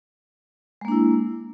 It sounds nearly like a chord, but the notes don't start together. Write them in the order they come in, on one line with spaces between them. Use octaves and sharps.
G#3 A#3 D4 E4